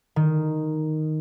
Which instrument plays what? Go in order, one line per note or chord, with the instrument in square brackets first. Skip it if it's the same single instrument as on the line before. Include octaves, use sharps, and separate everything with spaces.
[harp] D#3